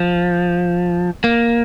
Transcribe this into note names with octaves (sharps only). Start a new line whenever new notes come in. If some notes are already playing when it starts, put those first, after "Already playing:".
Already playing: F3
A#3